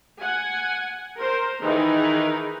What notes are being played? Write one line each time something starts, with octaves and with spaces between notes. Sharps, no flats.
F#5 G#5
A#4 C5
D#3 E3 D#4 G#4 A#4 B4